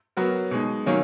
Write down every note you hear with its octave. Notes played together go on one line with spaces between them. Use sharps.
F#3 B3 F#4 A#4
B2 G#3 D#4
D#3 F#3 A#3 C#4